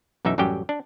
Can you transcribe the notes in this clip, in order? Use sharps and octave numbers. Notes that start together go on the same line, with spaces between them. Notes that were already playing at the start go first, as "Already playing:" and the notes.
B1 F#2 E3 D#4 E5
A1 F#2 F#3 G3 G4 G5
D4